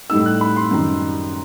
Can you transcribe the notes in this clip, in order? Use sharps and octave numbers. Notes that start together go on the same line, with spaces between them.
A2 G3 D#4 E6
F#6
B5
C6
F#2 D#3 G3 D#4